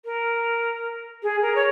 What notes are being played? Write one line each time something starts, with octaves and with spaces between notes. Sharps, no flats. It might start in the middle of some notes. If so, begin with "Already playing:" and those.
A#4
G#4
A#4
C#5